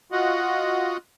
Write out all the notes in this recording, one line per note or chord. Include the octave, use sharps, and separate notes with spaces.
F4 F#4 D#5 F#5